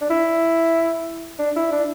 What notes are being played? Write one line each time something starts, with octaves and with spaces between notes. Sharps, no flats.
D4
E4
D4
E4
D4